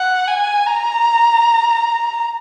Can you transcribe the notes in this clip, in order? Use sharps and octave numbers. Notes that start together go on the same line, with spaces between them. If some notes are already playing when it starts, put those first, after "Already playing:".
Already playing: F#5
G#5
A#5